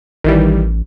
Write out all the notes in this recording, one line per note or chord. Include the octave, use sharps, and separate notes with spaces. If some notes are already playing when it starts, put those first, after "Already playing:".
A1 D#3 E3 G3